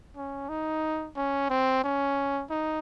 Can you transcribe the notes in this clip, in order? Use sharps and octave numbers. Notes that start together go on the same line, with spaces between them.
C#4
D#4
C#4
C4
C#4
D#4